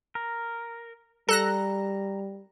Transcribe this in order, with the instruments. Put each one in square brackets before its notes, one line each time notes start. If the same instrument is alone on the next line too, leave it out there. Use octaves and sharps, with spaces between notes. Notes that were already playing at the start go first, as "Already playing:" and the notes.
[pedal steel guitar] A#4
[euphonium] G3 [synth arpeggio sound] A4 F#6 A#6 [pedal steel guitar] A#5